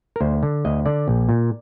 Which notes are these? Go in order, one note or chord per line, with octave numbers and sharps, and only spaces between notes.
A#4
D2 C5
D3
D2 D#5
D3 D5
A#1
A#2